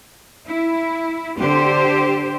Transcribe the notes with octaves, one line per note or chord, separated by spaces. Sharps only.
E4
D3 G4 C5